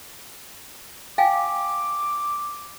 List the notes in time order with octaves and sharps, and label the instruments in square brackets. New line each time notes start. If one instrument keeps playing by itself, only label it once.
[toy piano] F5 G5 G#5 [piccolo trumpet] D6